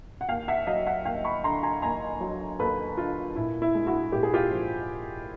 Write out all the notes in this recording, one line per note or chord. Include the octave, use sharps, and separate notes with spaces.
F#5
D#2 F5 G5
E5 F#5
F#3 D#5 F5
E5 F#5
D#2 F5 G5
B5 C#6
D3 A#5 C6
G#5 A#5
D#2 G#5 A#5
F#3
D#2 A4 B4
D3 F4
A#2 E4
E4
G#3
E4 F#4
A#2 G4
G#4
F4 G4
F3